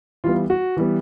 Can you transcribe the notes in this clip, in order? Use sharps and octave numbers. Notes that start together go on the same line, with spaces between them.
E3 G3 B3 F4
F#4
E3 G3 B3